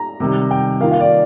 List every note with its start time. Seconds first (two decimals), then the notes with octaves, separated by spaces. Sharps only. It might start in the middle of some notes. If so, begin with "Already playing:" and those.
Already playing: A#5
0.20 C3 D#3 G3
0.51 G5
0.80 D#3 A#3 F4 F5
0.91 F5
1.00 D5